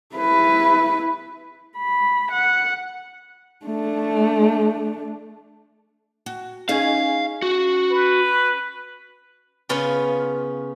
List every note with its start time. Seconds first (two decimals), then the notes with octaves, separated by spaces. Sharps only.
0.16 E4 B4
1.77 B5
2.32 F#5
3.65 A3 D4
6.26 F#4
6.69 C#4 D#4 G#4 F5
7.42 F#4
7.91 B4
9.69 C#3 B3 C#4 F4